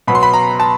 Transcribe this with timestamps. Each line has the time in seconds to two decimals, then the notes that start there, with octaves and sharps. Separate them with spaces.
0.07 B2 F#3 B3 B5
0.15 C6
0.23 B5
0.34 A#5
0.60 A5